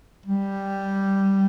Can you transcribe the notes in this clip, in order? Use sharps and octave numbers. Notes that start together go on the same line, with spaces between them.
G3